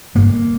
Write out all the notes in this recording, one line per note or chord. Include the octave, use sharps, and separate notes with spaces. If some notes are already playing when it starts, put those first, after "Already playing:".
G1 G2 D3 A#3